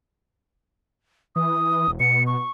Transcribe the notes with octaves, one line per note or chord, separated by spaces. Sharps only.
E3 D#6
E1
B2 C#7
C#6